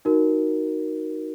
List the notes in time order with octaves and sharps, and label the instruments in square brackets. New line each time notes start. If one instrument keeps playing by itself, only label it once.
[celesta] D#4 F#4 A#4